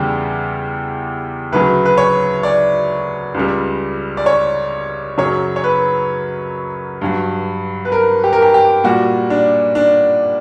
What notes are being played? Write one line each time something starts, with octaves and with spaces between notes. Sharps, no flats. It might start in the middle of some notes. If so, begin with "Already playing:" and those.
Already playing: E2 C#3 G3 G4
D2 C#3 F#3 B4
B4
C#5
D5
C#2 C#3 G3
D5
C#5
F#2 C#3 F#3 C#5
C#5
B4
G2 F#3
B4
A#4
G4
A#4
G4
G4
A#2 G3 F#4
D4
D4